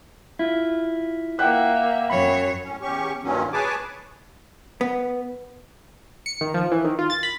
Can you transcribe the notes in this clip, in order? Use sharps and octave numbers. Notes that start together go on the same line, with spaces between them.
E4 F4
A#3 E5 F#5 G5 F#6
F#2 C#5 B5
A2 C#4
E2 C#4 G4 C#6
G2 A#2 D#3 F#3 C#4
G#4 B4 C#5 G#5 A5 D6
B3
C#7
D#3
F3
E3
D#3
F4
A6
B5